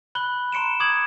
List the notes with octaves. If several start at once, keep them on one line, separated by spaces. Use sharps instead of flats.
B5 F#6 G7
A#5 C6 C#7 D7 E7
D6 D#6 G#6 F#7